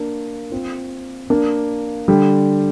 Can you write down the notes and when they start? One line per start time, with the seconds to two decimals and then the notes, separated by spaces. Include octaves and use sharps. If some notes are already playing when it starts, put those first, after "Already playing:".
Already playing: A#3 D4
0.51 C4 F4
1.30 A#3 D4
2.08 D3 G3